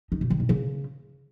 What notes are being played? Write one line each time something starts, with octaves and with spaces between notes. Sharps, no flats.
D#4
B2
D#3
B2
C#3